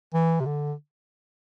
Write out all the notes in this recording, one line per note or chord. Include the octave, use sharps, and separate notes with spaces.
E3
C3
D3